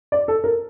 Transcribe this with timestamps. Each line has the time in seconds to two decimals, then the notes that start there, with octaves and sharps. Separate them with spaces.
0.12 D5
0.28 A4
0.44 A#4